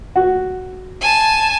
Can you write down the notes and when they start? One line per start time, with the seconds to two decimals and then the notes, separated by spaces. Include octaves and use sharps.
0.16 F#4
1.01 G#5 A5